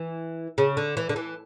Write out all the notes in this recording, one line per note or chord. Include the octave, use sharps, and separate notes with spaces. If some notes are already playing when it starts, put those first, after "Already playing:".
Already playing: E3
C#3
D3
E3
D3
E3